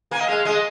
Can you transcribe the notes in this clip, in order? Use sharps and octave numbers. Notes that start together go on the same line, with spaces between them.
A#3 G#5
D#5
G#3 F5
G#3 D#5